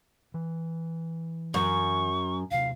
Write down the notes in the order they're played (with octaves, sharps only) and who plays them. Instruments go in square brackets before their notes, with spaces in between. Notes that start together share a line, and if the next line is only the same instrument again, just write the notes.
[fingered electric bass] E3
[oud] F#2 [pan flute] C#6
[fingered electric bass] D#1 C3 [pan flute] F5